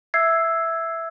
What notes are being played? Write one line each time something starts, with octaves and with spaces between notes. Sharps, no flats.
E5 E6 G#6 C7